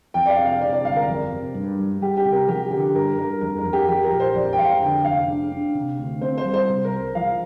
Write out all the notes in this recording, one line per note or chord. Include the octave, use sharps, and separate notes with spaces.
F2 G5
D5
F5
C3
F5
C3 D5
D5
G1 F5
A#4
F2
C3
G2
G3
G3 G4
G4
C3
A#4
F3 G4
D3 G4
G2 A#4
G2 A#4
F2 A#4
A#4
F2
G4
F3 G4
A#4
A#1
C5
F2 D5
G5
F2 F5
D3 G5
F1 F5
D4
D4
C3
D2
C4 C5
C5
G3
C5
C3
A#4
C2
F3 F5